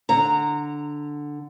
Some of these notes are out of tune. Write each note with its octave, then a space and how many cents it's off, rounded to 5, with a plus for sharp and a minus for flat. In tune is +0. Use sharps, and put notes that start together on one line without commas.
D3 +0 A#5 -20